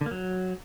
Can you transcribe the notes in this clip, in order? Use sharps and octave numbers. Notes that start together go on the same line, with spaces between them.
D3
A#3
F#3